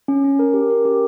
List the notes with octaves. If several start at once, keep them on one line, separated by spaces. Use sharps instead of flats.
C#4
C#4
A#4
G4
A#4
G4